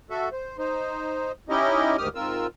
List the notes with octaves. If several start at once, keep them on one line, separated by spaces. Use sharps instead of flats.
F#4 A4 E5
C5
D#4 C5
C#4 D#4 E4 G4 D#5
D2 G#2 D#3 G4 D#6 F6
G#2 C4 F4 A#4 E6